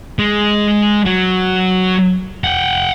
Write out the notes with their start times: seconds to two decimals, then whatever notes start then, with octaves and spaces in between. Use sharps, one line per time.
0.19 G#3
1.06 F#3
2.44 F#5 G5